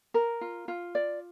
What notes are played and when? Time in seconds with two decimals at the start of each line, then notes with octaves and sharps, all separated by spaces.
0.14 A#4
0.41 F4
0.68 F4
0.95 D5